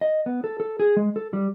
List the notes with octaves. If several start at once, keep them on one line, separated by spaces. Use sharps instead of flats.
D#5
B3
A4
A4
G#4
G#3
A4
G3